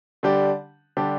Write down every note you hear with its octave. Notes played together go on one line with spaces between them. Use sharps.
D3 G3 D4 G4
D3 G3 D4 G4